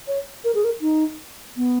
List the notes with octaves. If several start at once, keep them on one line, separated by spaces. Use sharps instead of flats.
C#5
A#4
G#4
A#4
D#4
B3